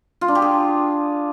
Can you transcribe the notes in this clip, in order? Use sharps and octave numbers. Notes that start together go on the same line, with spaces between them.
F4
D4
G4
G#4